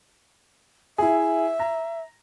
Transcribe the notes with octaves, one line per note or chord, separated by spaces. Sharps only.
E4 G#4 E5
A#5